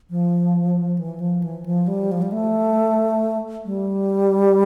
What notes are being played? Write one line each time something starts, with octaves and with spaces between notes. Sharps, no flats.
F3
E3
F3
E3
F3
G3
F3
G3
A3
G3